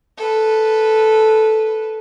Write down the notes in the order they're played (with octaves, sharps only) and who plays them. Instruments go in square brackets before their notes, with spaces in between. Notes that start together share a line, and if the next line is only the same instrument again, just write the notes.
[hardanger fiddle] A4 B4